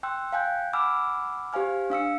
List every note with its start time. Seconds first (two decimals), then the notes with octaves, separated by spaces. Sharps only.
0.03 G5 C6 E6 F#6
0.32 F5 G5 G#5 F#6 G6
0.73 F#5 G#5 B5 D6 E6 F6
1.53 G4 C5 F5 G#5 F6
1.90 D4 F5 E6 C#7